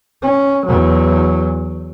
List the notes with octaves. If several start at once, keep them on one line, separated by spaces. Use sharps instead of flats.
C#4
E2 F#3